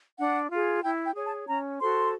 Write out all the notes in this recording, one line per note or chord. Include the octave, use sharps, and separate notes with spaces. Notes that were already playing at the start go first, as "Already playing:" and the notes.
D4 F#5
F4 G#4
E4 G5
G5
G#4 C#5
A5
C#4 A#5
F#4 A4 C5 C6